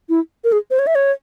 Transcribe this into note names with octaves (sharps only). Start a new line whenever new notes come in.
E4
A#4
G#4
C5
C#5
E5
C#5